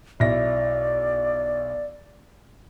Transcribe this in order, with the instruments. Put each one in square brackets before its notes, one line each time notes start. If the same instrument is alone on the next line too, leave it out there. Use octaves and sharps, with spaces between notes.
[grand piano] B1 E4 A#6 [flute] D5